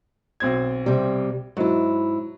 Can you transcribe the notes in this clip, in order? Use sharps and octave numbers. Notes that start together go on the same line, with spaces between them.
B1 C4 G#6
C3 G3
G#2 F#3 E4